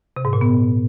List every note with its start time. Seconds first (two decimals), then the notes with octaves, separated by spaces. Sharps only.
0.16 C3
0.25 G#2
0.33 A#2
0.41 B3